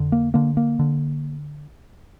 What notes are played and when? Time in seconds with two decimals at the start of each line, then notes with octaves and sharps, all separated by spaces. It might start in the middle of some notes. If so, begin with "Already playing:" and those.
Already playing: F2 D3
0.12 A#3
0.34 D3 A#3
0.57 A#3
0.79 D3